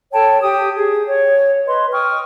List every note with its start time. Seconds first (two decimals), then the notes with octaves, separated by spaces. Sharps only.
0.13 A4 C#5 G5 A5
0.42 G4 G5 D#6
0.77 G#4
1.08 C#5
1.68 B4 D#5 C6
1.93 G5 C#6 D#6 F6